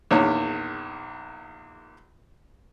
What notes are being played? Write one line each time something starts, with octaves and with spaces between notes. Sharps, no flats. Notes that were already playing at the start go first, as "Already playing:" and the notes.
A#1 E2 D#3 C#5